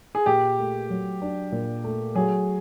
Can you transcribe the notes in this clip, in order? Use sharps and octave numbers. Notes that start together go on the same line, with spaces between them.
G#4
A#2 G4
A3
F#3
D4
A#2
A3
F#3 G#4